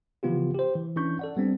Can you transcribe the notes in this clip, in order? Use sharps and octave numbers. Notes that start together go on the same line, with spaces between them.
C#3 E3 F3 B3 F4 G4
G4 C5
E3
E3 C#4 D4 C#6 G6
A4 D5 F#5
G3 B3 C4 D4